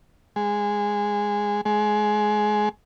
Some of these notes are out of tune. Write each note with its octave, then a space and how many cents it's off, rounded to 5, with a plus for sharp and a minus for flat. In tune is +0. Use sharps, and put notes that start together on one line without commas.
G#3 -10
G#3 +20